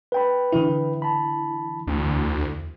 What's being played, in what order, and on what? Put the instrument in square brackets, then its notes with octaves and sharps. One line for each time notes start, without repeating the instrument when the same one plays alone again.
[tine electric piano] B4 G5 B5
[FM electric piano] D3 E3 E4
[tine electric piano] A5 B5
[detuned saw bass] D2
[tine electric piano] E2